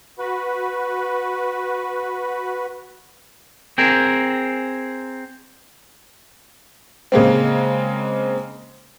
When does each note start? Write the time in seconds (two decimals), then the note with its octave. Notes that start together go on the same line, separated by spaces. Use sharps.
0.19 F#4 B4
3.78 C4 G#4 A#4
7.12 C#3 G#3 A#3 C4